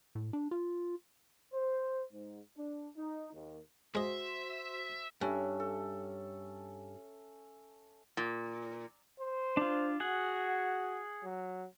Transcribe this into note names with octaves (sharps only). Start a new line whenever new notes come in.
A2
D4
F4
C5
G#2
D4
D#4
D#2
G#3 F#4 C5 D#5 E5 C6
G2 C#4 A4 E5
A4
A#2
C5
D4 F4
F#4 G#4 F#5
F#3